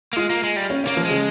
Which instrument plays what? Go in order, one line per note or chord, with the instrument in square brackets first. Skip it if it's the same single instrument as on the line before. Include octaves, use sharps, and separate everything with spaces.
[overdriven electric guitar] A#3
[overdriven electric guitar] G#3 [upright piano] F4
[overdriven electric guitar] A#3
G#3
G3
[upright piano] C#4
[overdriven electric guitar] A#3 [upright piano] C#4
[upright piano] F3
[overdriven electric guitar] G#3
[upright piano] C#3